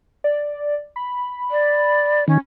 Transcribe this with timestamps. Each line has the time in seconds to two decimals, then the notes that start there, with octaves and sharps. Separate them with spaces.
0.24 D5
0.96 B5
1.51 D5
2.28 D#3 C#4